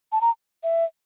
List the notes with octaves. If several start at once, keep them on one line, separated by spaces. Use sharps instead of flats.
A5
A#5
E5